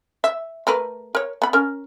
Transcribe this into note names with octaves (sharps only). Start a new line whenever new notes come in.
E5
A3 A#4 B4
A#4 C#5
B3 B5
C#4 A#4